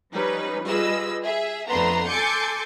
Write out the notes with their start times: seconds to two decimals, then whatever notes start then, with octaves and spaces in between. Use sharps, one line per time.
0.13 F3 G3 C#4 D#4 B4
0.66 G3 F4 G#4 B4 D#5 E6
1.24 G#4 E5
1.68 F2 A3 B3 D4 A#5 C6
2.08 A4 G#5 C6 D6 G6 C#7